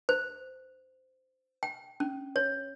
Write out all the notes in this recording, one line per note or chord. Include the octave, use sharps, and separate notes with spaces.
C5
G5
C#4
C#5